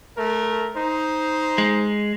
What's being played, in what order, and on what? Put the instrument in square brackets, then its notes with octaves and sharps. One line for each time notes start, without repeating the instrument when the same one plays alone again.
[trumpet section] A3 A#4
D#4 C5
[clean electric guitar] G#3